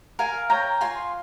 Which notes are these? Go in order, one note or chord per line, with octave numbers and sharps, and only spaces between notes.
A#4 F5 G#5
C#5 G5 A#5
F4 G#5 C6